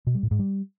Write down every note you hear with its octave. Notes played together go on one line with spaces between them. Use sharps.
B2
G3
A2
G#2
G3